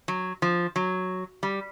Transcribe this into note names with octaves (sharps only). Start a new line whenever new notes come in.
F#3
F3
F#3
G3